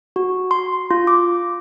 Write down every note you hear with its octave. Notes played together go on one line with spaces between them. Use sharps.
F#4
C6
F4
D6